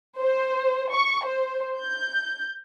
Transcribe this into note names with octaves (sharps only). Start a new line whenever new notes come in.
C5
C#6
C5
G6